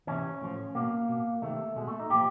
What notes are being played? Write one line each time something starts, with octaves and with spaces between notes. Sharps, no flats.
C3 E3 C#4
A2 F3
B2 A#3
B2
C3 D#3 A3
B2 G#3
A3
D#4
A#2 F3 G4